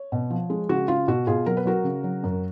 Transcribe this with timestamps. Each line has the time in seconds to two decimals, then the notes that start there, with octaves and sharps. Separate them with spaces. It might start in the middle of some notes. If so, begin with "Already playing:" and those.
Already playing: C#5
0.12 B2
0.30 F3
0.50 G#3
0.69 C#3 F#4
0.88 C#3 F4
1.08 B2 F#4
1.27 B2 F4 G#4
1.46 F#3 A#4
1.57 B4
1.65 F#3 F#4 A#4
1.84 C#3
2.04 F#3
2.23 F#2